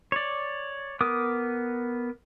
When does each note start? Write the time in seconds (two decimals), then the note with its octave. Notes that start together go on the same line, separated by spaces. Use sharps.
0.12 C#5 D5
1.01 B3 A#4 D6 D#6